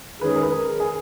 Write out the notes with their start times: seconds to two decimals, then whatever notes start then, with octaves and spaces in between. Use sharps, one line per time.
0.21 D#3 G#3 C#4 G#4 B4
0.35 A#4
0.43 B4
0.51 A#4
0.80 G#4